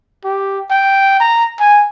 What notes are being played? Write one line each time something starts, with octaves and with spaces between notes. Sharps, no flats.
G4
G5
A#5
G#5